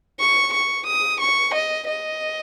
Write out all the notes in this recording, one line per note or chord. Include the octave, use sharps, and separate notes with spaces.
C#6
C#6
D#6
C#6
D#5
D#5